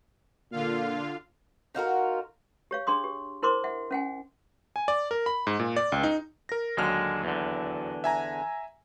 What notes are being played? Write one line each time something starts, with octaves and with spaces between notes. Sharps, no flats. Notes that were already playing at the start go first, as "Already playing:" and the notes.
A#2 D3 F4 F5
D#4 F4 F#4 A#4
G4 C#5 F5
D4 G#4 C6 D#6
G4
E4 A#4 C5 C6 D6
E5 F#5
C#4 F#5 G#5
G#5
D5
A#4
B5
G#2
A#2
D5
C#2
D#4
A#4 A#6
D#2 D3 F#3 G#3 F6
E2 D3
E5 G#5 A#5